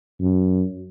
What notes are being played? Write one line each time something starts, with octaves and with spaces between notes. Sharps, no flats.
F#2